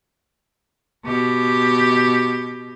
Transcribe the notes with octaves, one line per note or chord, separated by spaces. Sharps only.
B2 G4